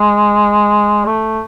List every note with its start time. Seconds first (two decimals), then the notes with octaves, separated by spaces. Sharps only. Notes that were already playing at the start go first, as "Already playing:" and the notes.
Already playing: G#3
1.05 A3